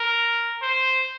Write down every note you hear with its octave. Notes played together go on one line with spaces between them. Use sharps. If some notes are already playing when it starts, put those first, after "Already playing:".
Already playing: A#4
C5